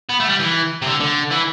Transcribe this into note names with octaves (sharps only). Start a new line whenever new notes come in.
B3
A3
G3
E3
C3
D3
D3
E3